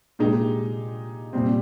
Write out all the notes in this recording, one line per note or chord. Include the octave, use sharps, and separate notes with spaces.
A#2 G#3 D#4 G4
A#2 G3 C4